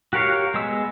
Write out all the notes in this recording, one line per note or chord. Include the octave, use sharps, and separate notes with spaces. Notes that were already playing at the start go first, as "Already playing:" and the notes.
F#4 G4 A#4 C#5 F5
G#3 B3 E6